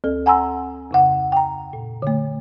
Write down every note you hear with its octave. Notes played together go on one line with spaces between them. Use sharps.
D2 A4
F#5 G#5 A#5 C6 E6
F2 C#3 F#5
G5 A#5
A#2
D3 A3